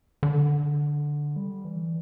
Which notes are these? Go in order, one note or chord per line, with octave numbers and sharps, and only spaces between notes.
D3
G3
E3